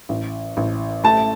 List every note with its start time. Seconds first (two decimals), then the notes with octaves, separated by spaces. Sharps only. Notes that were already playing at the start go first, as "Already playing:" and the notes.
0.09 A1
0.57 A1
1.04 A3 A5